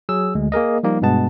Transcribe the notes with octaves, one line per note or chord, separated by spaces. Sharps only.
F#3 G#4 E6
D2 G#3
A#3 G#4 A#4 D#5
F3 G3 A#3 D#4
G2 B2 G#3 B3 A5